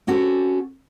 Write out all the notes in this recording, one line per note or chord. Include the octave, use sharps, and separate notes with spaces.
C4 C#4 F#4 G4 A4